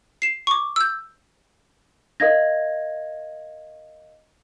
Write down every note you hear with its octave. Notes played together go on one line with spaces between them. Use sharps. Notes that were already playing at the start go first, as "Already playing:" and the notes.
C7 E7
C#6 D6
E6 G6
A#4 D#5 F5 G#6 A#6